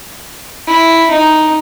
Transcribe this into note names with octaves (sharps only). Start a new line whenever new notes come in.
E4
D#4